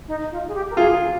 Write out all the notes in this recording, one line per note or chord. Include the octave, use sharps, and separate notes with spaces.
D#4
F4
G#4
G4
A#4
F4 G#4